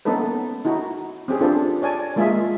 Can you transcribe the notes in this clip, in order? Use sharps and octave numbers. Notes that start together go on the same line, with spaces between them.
A#3 B3 C#4 D#4 A4 B4
D#4 E4 F#4
C4 C#4 G4 G#4
D4 F4 A4 B4 C5
C#5 D5 G#5 A5
G#3 A#3 F4 G#4 E5